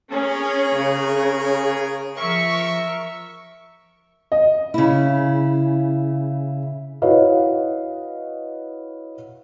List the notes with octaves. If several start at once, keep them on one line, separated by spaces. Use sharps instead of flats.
C#4 G#4 A#4 C#5
C#3
F3 A#4 E5 C#6
D#5
C#3 E4
E4 F#4 B4 C#5 D#5 F5